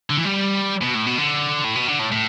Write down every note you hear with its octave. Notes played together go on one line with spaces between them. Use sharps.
D3
E3
G3
B2
A2
B2
D3
A2
B2
D3
A2
A2